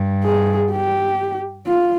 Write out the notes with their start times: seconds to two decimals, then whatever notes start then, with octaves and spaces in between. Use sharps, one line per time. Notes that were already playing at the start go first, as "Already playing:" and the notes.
Already playing: G2
0.24 G#4
0.71 G4
1.67 F4